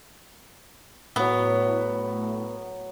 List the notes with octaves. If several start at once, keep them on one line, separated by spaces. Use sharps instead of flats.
A2 F#3 B3 B5